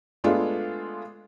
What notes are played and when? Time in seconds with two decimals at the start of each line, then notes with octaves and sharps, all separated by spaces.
0.24 G#3 A3 B3 D4 F4